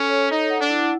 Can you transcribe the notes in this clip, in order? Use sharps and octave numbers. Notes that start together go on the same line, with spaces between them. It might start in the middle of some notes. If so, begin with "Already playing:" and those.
Already playing: C#4 A4
C#5
D#4 A4
F#5
D4
E4